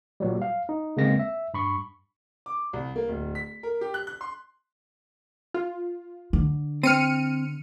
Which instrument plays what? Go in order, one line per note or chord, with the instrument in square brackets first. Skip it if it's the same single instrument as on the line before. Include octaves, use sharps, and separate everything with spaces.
[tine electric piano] A#2 F#3 G3
F5
D#4
C#3 G#3 A#3 C4 A#6
E5
G2 B5 C#6
[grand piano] D6
C2
A#3
D1
B6
A#4
G4
F#6
F#6
C6
[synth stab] F4
[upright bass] D3
[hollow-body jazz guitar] C4 [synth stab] F6 C#7 D#7